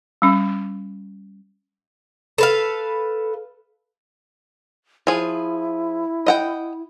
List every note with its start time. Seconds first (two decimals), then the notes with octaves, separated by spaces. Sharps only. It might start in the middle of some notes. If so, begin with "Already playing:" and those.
0.22 G3 C#4
2.38 A4 B4 F5
5.07 F3 E4 G#4
6.26 D#5 F#5 G5